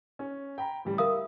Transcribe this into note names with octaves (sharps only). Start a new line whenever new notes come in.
C#4
G5 A#5 B5
A1 G3
A#4 E5 F5 D#6